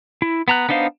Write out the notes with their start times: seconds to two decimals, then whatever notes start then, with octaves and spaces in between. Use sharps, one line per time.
0.22 E4
0.48 B3 A#5 F#6
0.69 B3 D4 D#4 C5 F5